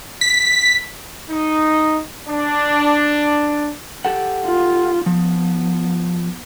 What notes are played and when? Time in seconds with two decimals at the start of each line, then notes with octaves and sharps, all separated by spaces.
0.21 B6
1.29 D#4
2.28 D4
4.05 G4 A4 F#5
4.45 F4
5.06 F3 B3